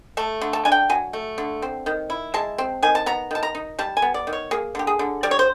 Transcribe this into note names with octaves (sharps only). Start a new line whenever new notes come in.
A3 A5
D3
A5
D4 G#5
G5
F#3 G#5
A3
D3
C4
D#3
E4
G#3 A5
C4
D#3 G#5
A5
B3 A#5
D#3 A5
A#5
D#4
G3 A5
G#5
B3
D5
D#3
C#5
A#3 G#4
D3 G4
G#4
D3
G3 D5
C#5
C5